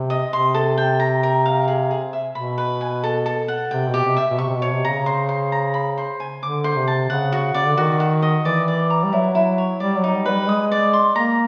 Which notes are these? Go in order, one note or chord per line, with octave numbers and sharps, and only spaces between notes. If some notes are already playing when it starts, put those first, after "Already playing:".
Already playing: C3
D#5
C3 C6
A4
G5
A#5
A#4
F5
G#4
G#4
E5
B2 B5
B4
G#5
A4
A4
F#5
C3 G5
B2
G4
C3
E5
B2
C3 C#6
C3
B2
C#5
C3
A#5
C#3
C5
C5
A#5
B5
C5
G#5
D3 D6
C5
C3
A5
C#3 F#5
F#4
C#3 D5
D3
D#3 F#4
F#4
D#5
E3 D5
D5
A#5
G3
F#3 E4
E4
C#5
G3 D5
F#3
D#4
G3
F#3 B4
G3
G#3 D#6
D5
C6
A#3 A#5